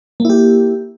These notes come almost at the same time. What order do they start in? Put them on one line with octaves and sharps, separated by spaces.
A#3 E4 G4